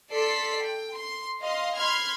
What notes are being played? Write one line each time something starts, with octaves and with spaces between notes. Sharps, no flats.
A4 D5 C6 B6 C7
G5
C6
D#5 F5 C6
B5 C6 F6 G#6